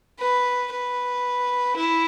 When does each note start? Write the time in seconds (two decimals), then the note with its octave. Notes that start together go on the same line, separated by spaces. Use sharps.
0.20 B4
0.71 B4
1.76 E4